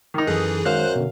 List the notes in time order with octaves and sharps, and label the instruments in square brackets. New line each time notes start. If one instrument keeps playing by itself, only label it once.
[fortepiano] D#3 D#4
[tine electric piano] F#2 A4 F#6 [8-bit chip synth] E3 G#4
[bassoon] F#2 [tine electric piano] D#3 G#3 [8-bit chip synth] C5 F#6 [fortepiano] F5
[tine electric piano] B2 D3